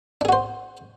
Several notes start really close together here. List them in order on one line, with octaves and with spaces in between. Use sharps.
D4 G#4 F#4 C5